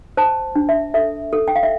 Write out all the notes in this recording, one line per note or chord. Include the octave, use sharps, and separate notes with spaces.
C5 A5
D4
E5
A4 E5
A4
G5
F5
E5